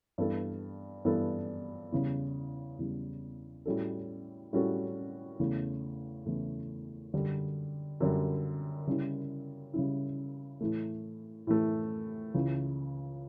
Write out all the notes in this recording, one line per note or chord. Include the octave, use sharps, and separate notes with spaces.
G2 E3 B3 D4 A4
G2 E3 B3 D4 A4
E2 C#3 G3
E2 C#3 G3
A2 G3 C#4 F#4 A4
A2 G3 C#4 F#4 A4
E2 C#3 E3 A3
E2 C#3 E3 A3
F#2 D3 G3
F#2 D3 G3
C#3 G3 C#4 E4
C#3 G3 C#4 E4
A2 E3 A3
A2 E3 A3
C#2 C#3 E3